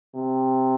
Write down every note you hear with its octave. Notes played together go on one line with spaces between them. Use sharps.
C3